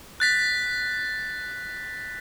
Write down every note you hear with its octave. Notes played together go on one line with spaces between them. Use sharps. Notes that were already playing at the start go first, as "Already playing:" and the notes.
F#6 A6 B6